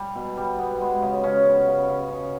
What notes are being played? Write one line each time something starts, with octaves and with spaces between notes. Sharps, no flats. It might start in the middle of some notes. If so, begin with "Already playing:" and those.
Already playing: G3
B2
G3
B3
G#3
C#3
C#3 C#4
B3
C#3
C#3
C#3